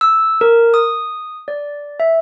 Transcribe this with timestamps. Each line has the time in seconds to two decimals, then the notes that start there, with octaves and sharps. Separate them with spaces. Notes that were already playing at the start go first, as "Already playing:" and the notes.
0.01 E6
0.41 A#4
0.74 D#6
1.48 D5
2.00 E5